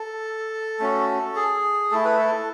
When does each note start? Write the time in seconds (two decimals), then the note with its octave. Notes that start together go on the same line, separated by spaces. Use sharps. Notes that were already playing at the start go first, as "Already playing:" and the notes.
Already playing: A4
0.80 A3 C#4 F#4
1.36 G#4
1.91 A3 E4 A4
2.05 B4
2.18 A4